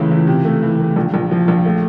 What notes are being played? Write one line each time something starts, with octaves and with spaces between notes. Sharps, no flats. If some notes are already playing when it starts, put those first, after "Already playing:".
Already playing: C#2 C#3 E3 A3
E3
C3
A3
E3
A3
A#1
A#1
F3
A#1
A3